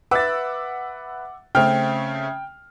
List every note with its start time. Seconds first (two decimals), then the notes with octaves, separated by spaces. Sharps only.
0.11 B4 E5 F#5 D6 E6 A6
1.55 C#3 A3 C4 G5 F6